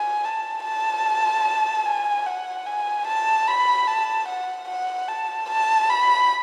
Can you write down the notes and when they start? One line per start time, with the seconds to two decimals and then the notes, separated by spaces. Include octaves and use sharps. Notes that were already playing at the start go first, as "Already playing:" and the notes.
Already playing: G#5
0.25 A5
0.64 A5
1.86 G#5
2.26 F#5
2.66 G#5
3.07 A5
3.48 B5
3.88 A5
4.28 F#5
4.69 F#5
5.09 A5
5.50 A5
5.90 B5